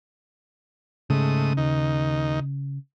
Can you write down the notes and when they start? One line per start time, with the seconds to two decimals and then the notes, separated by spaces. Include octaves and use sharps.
1.10 G#2 C#3 A3 D#6
1.57 D#2 D#4